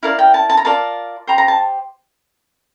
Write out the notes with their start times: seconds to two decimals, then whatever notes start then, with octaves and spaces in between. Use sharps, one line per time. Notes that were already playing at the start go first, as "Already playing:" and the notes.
0.03 E4 A#4 D5 F5
0.19 G5
0.34 A5
0.50 A5
0.57 A#5
0.65 F4 A#4 D5 A5
1.27 G4 C5 A#5
1.38 A#5
1.48 A5